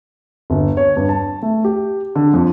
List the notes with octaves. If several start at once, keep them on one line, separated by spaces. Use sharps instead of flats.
G1
C#5
G2
A5
A3
G4
D3
F2